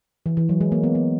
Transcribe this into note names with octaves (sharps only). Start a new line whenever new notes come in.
E3
E3
F#3
G#3
A#3
B3
B3